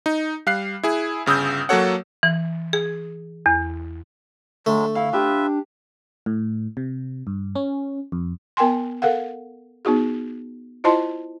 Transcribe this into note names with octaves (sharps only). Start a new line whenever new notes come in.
D#4
G3 F5 F#6 C7
E4 G#4
G1 C#3 D#6 E6 G6
F#3 A#3 F#4 A4 C#5 F#5
E3
G#4
E2
D3 F#3 G#3 A3
E4 F5
D4 F4 G4 B4 E5
A2
C3
G2
C#4
F2
B3 A#4 G5 G#5 C6
A4 A#4 F5 F#5
B3 D#4 F#4 G#4
E4 F4 C5 D#5 A5 C6